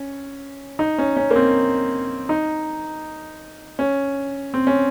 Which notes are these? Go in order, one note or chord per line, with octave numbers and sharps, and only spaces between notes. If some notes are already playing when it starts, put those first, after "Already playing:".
Already playing: C#4
D#4
C#4
C#4
A#3
C4
D#4
C#4
C4
C#4